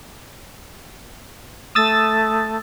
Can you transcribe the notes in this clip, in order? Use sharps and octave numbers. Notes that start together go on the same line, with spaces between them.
A3 D#6 E6 A6